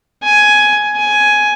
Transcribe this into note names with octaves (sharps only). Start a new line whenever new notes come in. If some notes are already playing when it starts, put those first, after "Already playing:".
G#5
G#5